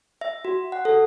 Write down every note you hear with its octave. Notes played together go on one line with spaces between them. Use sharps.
E5
F#4
F#5
A4